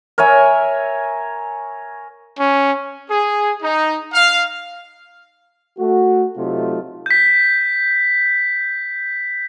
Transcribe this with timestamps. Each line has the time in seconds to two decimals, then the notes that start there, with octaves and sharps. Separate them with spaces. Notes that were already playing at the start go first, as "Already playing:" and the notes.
0.18 A#4 C#5 E5 G#5
2.39 C#4
3.09 G#4
3.61 D#4
4.13 F5
5.78 A3 F#4
6.36 C3 F#3 A3 D#4 F4
7.06 G6 B6